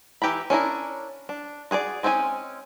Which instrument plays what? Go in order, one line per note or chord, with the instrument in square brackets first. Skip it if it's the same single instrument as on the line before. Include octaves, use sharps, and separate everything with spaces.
[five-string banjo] E3 G4 A#5 B5
C#4 D4 E4 A#4
D4
F#4 G#4 C#5 D5
G#3 C4 C#4 E4 G#5